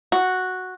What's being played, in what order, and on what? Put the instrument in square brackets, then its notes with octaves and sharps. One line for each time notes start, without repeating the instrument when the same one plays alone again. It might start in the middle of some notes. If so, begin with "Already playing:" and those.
[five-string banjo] F#4